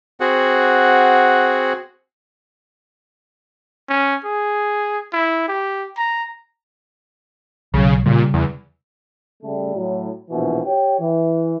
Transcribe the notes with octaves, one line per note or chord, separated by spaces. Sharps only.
C4 F#4 G#4 F#5
C#4
G#4
E4
G4
A#5
B1 C#3 F#3
A#2 C#3 G3
E2
C#3 G3 A3
A2 F#3
A#1 G#2 B2 E3
G4 C#5 G5
E3